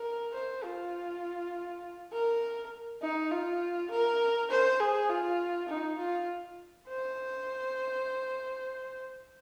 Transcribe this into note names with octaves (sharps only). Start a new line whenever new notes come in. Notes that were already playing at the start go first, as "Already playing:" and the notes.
Already playing: A#4
C5
F4
A#4
D#4
F4
A#4
C5
G#4
F4
D#4
F4
C5